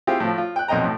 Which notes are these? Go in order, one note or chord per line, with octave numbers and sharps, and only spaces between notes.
C4 E4 F4 G4 G#4
A2 F3
F4
G5 F#6
B1 F2 D#5 G5 A#5
A2